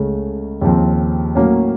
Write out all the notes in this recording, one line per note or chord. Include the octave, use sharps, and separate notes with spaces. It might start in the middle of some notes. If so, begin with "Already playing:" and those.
Already playing: C#2 C#3 A3
D#2 C#3 F3 C4
A2 F#3 A#3 C#4